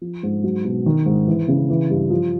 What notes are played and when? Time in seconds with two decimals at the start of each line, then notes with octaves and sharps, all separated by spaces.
0.01 F3
0.23 G#2
0.44 F#3
0.65 B2
0.86 D#3
1.06 G#2
1.28 E3
1.48 C#3
1.70 E3
1.90 G2
2.10 F3